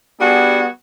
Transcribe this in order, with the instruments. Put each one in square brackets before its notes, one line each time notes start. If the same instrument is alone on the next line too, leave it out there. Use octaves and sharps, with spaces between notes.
[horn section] G3 B3 D4 F#4 G#4